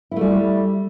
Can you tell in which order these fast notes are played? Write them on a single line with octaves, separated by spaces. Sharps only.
E4 A3 G3